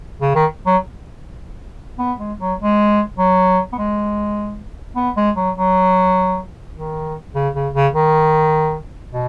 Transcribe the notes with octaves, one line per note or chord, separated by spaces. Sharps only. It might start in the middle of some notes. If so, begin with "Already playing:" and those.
C#3
D#3
F#3
B3
G#3
F#3
G#3
F#3
B3
G#3
B3
G#3
F#3
F#3
D#3
C#3
C#3
C#3
D#3
B2